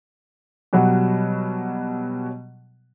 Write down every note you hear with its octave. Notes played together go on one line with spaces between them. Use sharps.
B2 F#3 G3 F#5